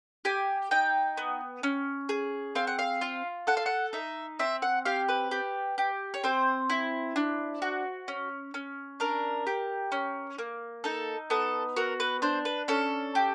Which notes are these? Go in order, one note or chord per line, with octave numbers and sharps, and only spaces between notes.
G4 G#5
D#4 G5
B3
C#4
G#4
C4 F5
F#5
F5
F4
A4 F#5
F5
F#5
D#4 E5
C4 E5
F#5
G4 F5
B4
G4
G4
C#5
C4 C5
E4
D4
F#4
C#4
C#4
D4 A#4
G4
C#4
A#3
D#4 A4
B3 A4
F#4 A#4
B4
D4 C5
B4
C#4 A4
G4